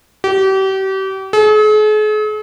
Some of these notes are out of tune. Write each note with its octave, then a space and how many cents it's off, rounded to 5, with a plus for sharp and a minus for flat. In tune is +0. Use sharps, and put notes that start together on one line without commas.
G4 -35
G#4 +45